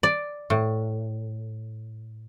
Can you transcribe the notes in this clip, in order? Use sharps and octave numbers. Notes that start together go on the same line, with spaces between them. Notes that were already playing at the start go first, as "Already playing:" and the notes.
D5
A2